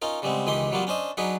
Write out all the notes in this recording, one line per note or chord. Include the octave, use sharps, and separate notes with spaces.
C#4 D#4 F4 A#4
C#3 G3 G#3 B3 C4
C#2 D#3 E3 G#3 G4 C6
F#3 G3 A#3 B3 F4
C#4 D4 C5 D#5
F#3 D4 D#4 G#4 B4